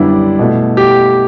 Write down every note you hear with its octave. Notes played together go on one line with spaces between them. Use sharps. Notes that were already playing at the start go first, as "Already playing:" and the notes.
Already playing: F#2 D3 G3 B3 D4 E4
B2 A3
G4